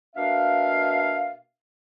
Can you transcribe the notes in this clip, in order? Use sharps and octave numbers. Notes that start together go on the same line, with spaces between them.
B2 A#3 D4 E5 F5